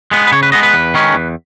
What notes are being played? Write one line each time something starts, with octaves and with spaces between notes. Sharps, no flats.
G#3 B3
B4
C#3 C#5
B4
G#3 B3 D#5
B4
E2
D#3 G#3 C#4
E2